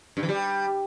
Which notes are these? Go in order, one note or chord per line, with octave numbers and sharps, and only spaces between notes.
G2
E3
G3